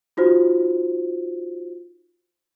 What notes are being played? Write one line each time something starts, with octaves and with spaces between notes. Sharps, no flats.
D#4 F4 F#4 C5